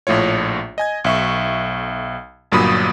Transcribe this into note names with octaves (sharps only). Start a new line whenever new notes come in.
A#1 A2 A3 F4 C#5
D#5 G#5 G#6
B1 E5 C#6
G1 G2 A#2 F#3 B5 D#6